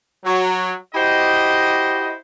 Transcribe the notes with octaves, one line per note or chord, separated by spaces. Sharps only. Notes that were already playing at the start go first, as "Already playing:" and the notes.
F#3
E4 F#4 G4 C5 D#5